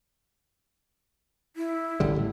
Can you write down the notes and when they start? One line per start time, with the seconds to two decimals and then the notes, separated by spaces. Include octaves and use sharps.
1.56 E4
2.00 A1 D3 G3
2.16 A2